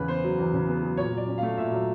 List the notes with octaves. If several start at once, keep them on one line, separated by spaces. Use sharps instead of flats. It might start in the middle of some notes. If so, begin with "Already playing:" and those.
Already playing: E2 C#3 B4
B3 C5
F#3
E2
C#3
B3
F#3
A#2 C#5
F#3 D5
C#4
A3 F5
A#2 E5
F#3